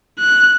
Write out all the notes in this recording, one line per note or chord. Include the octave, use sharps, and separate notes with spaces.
F#6